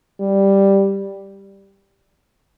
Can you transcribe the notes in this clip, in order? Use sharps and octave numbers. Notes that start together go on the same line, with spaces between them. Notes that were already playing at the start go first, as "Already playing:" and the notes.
G3